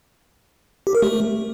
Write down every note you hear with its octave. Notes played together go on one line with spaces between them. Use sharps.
G4
A#4
A3